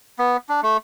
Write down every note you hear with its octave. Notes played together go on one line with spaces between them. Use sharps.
B3
D4
A3